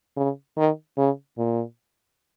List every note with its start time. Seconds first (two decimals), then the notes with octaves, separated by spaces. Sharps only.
0.17 C#3
0.57 D#3
0.97 C#3
1.38 A#2